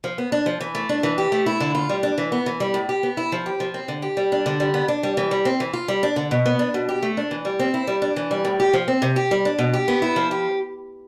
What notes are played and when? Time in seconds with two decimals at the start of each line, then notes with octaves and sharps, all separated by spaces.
0.04 F3
0.18 B3
0.32 D4
0.46 F3
0.61 E3
0.75 A3
0.89 D4
1.03 E3
1.18 G4
1.32 A3
1.46 E4
1.60 D3
1.75 F4
1.89 G3
2.03 D4
2.18 E3
2.32 B3
2.46 E3
2.60 G3
2.74 A2
2.89 G4
3.03 B3
3.17 E4
3.32 F3
3.46 G4
3.60 F3
3.74 C4
3.88 D3
4.02 G4
4.17 G3
4.32 D4
4.46 D3
4.60 G3
4.74 B3
4.88 D4
5.03 G3
5.17 E3
5.31 G3
5.45 C4
5.60 E3
5.73 F4
5.88 G3
6.03 D4
6.16 D3
6.31 B2
6.46 B3
6.59 D4
6.74 B2
6.89 G4
7.03 A3
7.17 D4
7.31 E3
7.45 G3
7.59 C4
7.74 E4
7.87 G3
8.02 D4
8.16 E3
8.31 G3
8.45 A2
8.60 G4
8.73 F3
8.88 C4
9.02 C3
9.16 G4
9.31 G3
9.45 D4
9.59 B2
9.73 G4
9.88 B3
10.02 E4
10.16 F3
10.31 G4